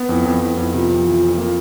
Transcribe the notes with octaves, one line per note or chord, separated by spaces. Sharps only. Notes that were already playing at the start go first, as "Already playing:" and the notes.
Already playing: B3
F2 E4
F2
F2 E4
F2 E4
C3 F4
F2
E3
F2
A#3 F4